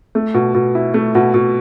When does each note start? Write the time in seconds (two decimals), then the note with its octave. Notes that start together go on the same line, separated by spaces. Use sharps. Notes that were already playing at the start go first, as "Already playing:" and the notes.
0.15 A3
0.34 B2
0.54 B2
0.75 E4
0.94 A3
1.15 B2
1.34 B2